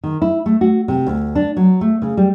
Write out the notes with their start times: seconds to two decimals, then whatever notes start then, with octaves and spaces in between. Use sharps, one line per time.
0.04 D#3
0.22 E4
0.46 A3
0.61 F#4
0.88 C3
1.07 D2
1.35 D4
1.57 F#3
1.81 A3
2.02 C#3
2.17 G3